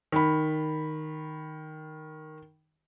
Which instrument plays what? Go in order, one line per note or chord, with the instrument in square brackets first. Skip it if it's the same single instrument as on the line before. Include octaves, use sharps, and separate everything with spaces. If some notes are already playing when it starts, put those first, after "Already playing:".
[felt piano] D#3 B5